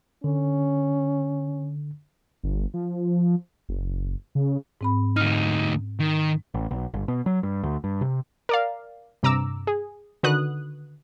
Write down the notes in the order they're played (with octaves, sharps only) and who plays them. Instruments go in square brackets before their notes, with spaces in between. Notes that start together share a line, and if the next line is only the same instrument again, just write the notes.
[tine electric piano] D3 [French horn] C#4
[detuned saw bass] G1
F3
F#1
C#3
[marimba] G#2 C4 B5
[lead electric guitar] D2 D#4 [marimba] F6
[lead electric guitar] D#3
[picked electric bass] A1
B1
G1
B2
F#3
G2
D2
G2
C3
[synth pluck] A#4 D5 F5
G2 C3 A#5 D6 E6
G#4
D3 D#3 F#4 B4 D#6 F#6